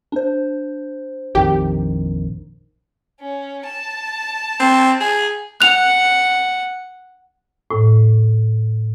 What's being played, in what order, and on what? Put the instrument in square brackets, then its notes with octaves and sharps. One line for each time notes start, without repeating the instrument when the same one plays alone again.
[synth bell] D4 C5
[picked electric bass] A#1 F2 D#3 [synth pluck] G4
[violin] C#4
A5
[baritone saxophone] C4
G#4
[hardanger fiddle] F#5 [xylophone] F#6 F7
[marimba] A2